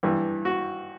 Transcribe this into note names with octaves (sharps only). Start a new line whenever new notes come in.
G2 E3 G3
F#4